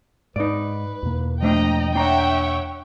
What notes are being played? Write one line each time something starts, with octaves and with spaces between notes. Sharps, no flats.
G#2 D#4 B4 D5
E2 B2 A#3
F3 A3 D4 D#5 G5 A#5
D4 C#5 E5 F#5 G5 A#5